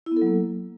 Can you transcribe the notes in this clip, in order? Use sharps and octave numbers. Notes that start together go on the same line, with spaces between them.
E4
B3
A4
F#3
A#3